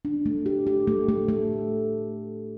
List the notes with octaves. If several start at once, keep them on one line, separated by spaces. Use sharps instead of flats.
D4
A3
G4
G4
A3
A3
A3